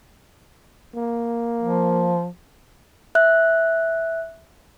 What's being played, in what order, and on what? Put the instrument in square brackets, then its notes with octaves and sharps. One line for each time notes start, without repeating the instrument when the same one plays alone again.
[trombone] A#3
[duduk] F3
[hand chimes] E5 F#6